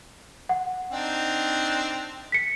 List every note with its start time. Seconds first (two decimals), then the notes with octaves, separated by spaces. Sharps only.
0.49 F#5
0.92 C4 D4 D#4
2.32 B6 C#7